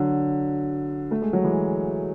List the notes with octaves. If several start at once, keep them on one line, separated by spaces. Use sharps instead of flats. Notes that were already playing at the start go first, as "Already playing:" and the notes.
Already playing: D3 F#3
A3
G#3
F#3
E3 G#3